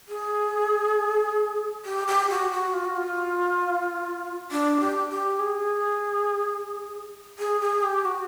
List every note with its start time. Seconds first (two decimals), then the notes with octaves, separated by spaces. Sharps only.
0.08 G#4
1.85 G4
2.07 G4
2.30 F#4
2.51 F#4
2.74 F4
2.85 F#4
2.96 F4
4.51 D4
4.81 G4
5.10 G4
5.39 G#4
7.39 G#4
7.61 G#4
7.83 G4
8.05 F#4